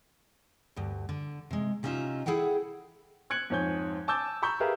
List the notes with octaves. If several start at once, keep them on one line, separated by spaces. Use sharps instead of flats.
D2 G2
D3
C3 G#3
C3 C#4 D#4 F4 E5
E4 G#4 A4 F#5 G5
F#6 G#6 C#7 F#7
F2 G#2 C#5 G#5 G6
G#5 A5 D6 E6 G6 A6
A#5 B5 C#6 E6 G6
G4 G#4 A#4 B4 E5 F5